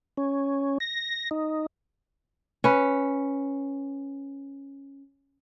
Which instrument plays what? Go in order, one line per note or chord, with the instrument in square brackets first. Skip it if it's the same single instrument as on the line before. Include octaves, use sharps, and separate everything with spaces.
[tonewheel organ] C#4
A#6
D#4
[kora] C#4 B4